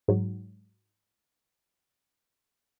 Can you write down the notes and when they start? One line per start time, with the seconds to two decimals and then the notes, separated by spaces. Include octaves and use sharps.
0.08 G#2 F#3